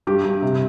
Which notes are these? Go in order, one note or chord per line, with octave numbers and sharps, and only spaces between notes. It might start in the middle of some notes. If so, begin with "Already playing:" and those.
G2 G4
G2
C3